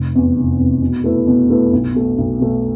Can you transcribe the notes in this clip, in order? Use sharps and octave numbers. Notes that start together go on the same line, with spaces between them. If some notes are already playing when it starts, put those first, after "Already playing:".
Already playing: F1
E2 C3
F1
E2 C3
B2
A3 E4 B4
B2
A3 E4 B4
B1
B2 A3
B1
B2 A3